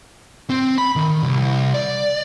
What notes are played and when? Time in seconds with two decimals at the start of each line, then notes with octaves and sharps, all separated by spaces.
0.50 C4
0.78 B5
0.96 D#3
1.23 C2
1.74 D5